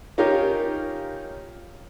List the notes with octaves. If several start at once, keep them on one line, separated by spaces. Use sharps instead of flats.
C#4 D#4 F4 G4 A#4